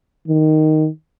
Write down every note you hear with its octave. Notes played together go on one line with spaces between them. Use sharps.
D#3